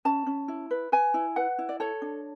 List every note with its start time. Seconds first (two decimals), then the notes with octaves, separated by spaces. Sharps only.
0.05 C#4 A5
0.26 C#4
0.48 E4
0.71 B4
0.92 B4 G#5
1.14 E4
1.36 B4 F#5
1.58 E4
1.69 D5
1.80 A4 C#5
2.02 D4